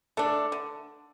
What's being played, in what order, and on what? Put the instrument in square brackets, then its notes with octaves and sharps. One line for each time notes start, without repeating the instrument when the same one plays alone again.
[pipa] A3 D4 [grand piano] A4
[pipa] D3